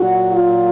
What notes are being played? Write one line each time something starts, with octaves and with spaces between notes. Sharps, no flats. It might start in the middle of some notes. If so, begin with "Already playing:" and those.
Already playing: A#2 F#3 F#4
F4